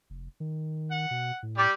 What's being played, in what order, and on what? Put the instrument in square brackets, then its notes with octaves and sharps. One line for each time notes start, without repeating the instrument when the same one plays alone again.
[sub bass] F1
D#3
[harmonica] F#5
[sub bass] B2
A2
[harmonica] G3 G4 D5